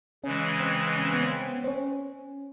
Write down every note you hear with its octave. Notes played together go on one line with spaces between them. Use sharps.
C#3 E3 G#3 C#4
C4
C#4
C4
B3
C4
C4
C4
C#4